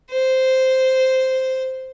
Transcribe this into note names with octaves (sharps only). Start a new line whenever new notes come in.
C5